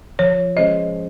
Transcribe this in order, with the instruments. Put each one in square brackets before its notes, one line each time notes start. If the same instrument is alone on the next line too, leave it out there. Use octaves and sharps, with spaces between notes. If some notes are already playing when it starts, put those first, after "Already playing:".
[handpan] F3 [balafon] C#5
[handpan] G#3 C#4 G#4 C5 [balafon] D#5